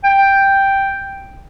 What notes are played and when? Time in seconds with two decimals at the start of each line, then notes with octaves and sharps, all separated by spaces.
0.04 G5